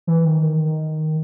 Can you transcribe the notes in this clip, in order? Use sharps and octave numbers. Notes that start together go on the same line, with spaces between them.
E3
D#3
D#3